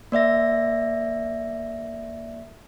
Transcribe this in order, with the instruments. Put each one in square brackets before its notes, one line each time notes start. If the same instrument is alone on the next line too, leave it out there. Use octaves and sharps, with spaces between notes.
[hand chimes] A#3 D5 E5 A#6